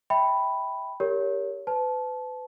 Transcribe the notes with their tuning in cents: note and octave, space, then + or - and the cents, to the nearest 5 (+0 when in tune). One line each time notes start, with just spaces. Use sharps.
E5 -25 G5 +0 B5 +0
G4 +5 A#4 -10 C#5 +20
B4 +35 A5 -20